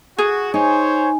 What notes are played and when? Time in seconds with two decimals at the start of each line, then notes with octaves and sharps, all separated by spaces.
0.18 F#4 G#4
0.54 D#4 C5 C#5 G#5